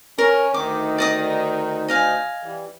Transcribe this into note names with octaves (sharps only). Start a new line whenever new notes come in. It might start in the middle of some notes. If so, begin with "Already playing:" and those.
C#4 A#4
D2 D#3 D#4 D6
D5 D#5 D#6
D#5 F5 G#5
E3 G3